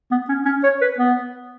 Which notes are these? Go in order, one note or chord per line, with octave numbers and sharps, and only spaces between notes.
B3
C#4
C#4
C#5
B4
B3